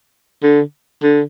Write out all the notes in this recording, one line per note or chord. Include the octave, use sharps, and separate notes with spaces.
D3
D3